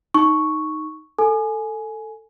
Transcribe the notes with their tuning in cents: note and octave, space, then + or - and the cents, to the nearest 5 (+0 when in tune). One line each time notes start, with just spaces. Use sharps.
D#4 +0 C#6 +0
A4 +10 G#5 +15